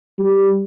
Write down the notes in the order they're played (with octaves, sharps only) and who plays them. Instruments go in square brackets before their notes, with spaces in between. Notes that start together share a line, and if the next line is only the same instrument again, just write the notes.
[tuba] G3